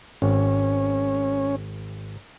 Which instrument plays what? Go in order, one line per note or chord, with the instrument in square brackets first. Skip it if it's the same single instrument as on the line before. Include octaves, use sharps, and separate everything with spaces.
[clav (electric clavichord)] G#1 [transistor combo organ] C#4